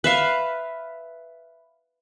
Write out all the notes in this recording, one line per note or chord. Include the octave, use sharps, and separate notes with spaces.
B4 E5 F5